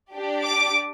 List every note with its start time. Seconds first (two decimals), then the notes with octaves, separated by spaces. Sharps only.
0.12 D4 G4
0.44 D6